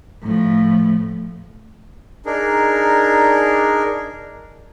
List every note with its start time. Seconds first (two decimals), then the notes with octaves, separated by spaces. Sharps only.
0.22 A2 F3
2.26 D4 D#4 G#4 A#4